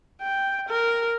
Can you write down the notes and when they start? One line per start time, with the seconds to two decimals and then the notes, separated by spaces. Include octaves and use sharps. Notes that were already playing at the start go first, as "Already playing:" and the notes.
0.22 G5
0.69 A#4